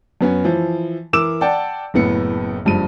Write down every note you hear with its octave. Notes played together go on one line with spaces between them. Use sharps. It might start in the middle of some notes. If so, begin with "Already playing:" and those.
F#2 B3 C#4
E3 F3
E3 A#4 D6 E6 E7
D5 F#5 G5 A5
F#1 A2 B3 C#7
F#1 G2 F3 D#7